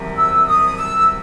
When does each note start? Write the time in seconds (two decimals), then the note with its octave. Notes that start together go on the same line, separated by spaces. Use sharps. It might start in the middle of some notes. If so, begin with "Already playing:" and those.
Already playing: C2 C3 D#3 F#3
0.16 E6
0.46 D#6
0.77 E6